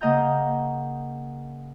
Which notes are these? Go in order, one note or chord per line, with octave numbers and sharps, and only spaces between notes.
C#3 A#3 D#5 F#5 A#5 G6